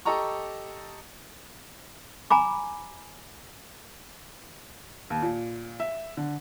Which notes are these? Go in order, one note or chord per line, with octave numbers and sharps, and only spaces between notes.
G4 A4 D#5 A#5 C#6
G#5 A#5 B5 D6
D#2
A#2
E5
D3